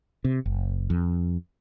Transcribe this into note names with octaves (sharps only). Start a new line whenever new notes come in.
C3
F#1
F2